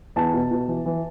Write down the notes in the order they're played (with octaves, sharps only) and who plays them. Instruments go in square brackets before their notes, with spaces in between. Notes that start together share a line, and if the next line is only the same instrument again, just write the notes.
[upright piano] E2 A5
B2
B2
E3
E3